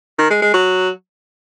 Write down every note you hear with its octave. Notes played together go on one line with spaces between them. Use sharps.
D#3
G#3
G#3
F#3